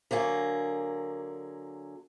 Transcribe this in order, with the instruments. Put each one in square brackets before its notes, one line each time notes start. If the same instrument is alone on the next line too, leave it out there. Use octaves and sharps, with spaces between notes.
[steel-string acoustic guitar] D3 F#3 A#3 G#4